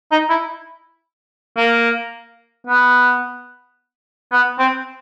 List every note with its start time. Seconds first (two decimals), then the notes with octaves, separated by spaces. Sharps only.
0.11 D#4
0.30 E4
1.57 A#3
2.67 B3
4.32 B3
4.59 C4